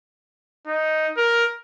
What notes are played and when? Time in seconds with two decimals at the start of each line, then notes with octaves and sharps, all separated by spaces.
0.66 D#4
1.17 A#4